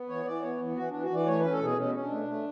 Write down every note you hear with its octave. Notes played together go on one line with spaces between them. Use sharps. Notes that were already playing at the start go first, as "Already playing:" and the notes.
Already playing: B3
E3 C#5
E3 D5
B3 C#5
E3
E3 F#4
E3 D4
F#4
E3 D5
A3 C#5
C#4 B4
A4
B2 G#4
B2 C#4
C#4
D4
A3
A3